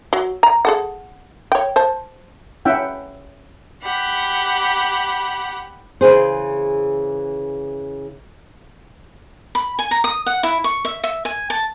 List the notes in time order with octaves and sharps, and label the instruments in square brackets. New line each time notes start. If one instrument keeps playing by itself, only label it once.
[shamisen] F#3
A#5
G#4 A4 F#5
C#5 G5
C5 A5
[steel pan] C#4 E4 E5 F#5 G5
[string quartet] G4 F#5 B5
[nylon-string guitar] C#3 E3 G#4 C5
[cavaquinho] B5
G#5
A#5
D#6
F#5
E4
C#6
E5
E5
G#5
A5